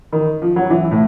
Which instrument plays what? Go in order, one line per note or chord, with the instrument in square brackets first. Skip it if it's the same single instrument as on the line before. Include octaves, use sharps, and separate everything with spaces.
[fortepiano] D#3
F3
F#3
E3
A2